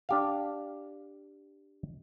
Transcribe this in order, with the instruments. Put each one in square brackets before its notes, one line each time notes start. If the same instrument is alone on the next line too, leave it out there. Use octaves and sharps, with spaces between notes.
[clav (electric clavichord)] D4 G4 F5